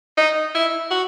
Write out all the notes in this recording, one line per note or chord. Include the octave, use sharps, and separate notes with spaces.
D#4
E4
F#4